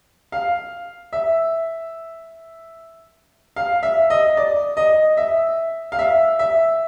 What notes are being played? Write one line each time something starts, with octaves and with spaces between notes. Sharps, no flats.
F5
E5
F5
E5
D#5
D5
D#5
E5
F5
E5
E5